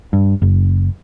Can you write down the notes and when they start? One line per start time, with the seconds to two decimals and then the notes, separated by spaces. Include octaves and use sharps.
0.13 G2
0.42 F#1